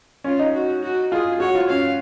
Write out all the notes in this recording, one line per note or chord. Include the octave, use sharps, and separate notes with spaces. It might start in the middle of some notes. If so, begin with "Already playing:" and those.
C#4 F4
D#4
F#4
F#4
F4 G#4
F#4 C#5
F4
C#4 F5